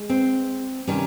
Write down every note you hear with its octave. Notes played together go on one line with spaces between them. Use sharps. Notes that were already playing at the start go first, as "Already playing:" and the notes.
Already playing: G#3
C4
C3 D#3 G3 C#4